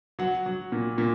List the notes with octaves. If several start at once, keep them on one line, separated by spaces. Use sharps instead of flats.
F#3 F#5
F#3
A#2
A#2